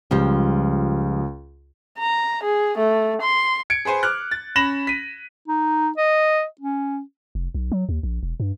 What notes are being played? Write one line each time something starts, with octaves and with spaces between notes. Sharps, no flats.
C#2 F3 G3
A#5
G#4
A3
C6
G#6 C#7 D7
G#4 B4 C5 G#5
D6 F6 F#6
A6
C#4 B5 A#6 E7 F#7
B6 D#7
D#4
D#5
C#4
F1
B1
F#3
D#2
A#1
E1
G2